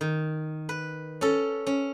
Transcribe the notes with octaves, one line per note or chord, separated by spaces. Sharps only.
D#3
B4
C#4 A4
C#4